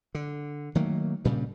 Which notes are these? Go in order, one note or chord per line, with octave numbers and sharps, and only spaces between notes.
D3
D#3 F#3 A3 A#3
G2 A#2 C#3 G3